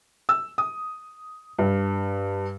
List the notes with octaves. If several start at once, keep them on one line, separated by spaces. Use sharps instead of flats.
E6
D#6
G2